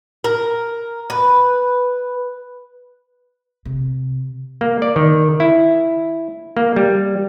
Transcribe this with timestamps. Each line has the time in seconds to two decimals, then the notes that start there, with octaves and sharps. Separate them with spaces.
0.24 A#4
1.10 B4
3.65 C3
4.61 A#3
4.82 D5
4.96 D#3
5.40 E4
6.57 A#3
6.76 G3